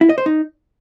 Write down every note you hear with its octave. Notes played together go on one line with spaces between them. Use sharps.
E4
D#5
C5
D#4